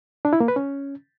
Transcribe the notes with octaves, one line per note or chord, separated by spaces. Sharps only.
D4
E4
A#3
B4
C#4